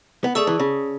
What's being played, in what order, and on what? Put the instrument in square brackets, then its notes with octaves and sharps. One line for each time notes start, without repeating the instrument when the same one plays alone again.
[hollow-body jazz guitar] B3
[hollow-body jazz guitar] A3 [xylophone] G#4 D5 A5 C#6 E6
[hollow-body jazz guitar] E3
C#3